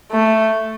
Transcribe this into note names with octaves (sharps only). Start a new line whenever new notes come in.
A3